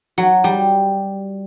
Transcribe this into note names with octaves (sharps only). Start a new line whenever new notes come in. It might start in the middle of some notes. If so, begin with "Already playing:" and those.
F#3
G3